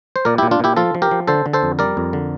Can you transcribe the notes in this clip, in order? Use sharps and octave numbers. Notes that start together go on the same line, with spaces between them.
C5
A#2 A#4 D5
E4 G4
A#2
D4 F4
A#2 E4 G4
F3 F4 A4
F3
G4 A#4
F3
D3 A4 C5
D3
A4 C5
F2
G3 A#4 D5
F2
D3